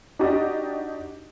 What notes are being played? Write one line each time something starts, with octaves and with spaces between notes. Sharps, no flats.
D4 D#4 F#4 G4 D5 D#5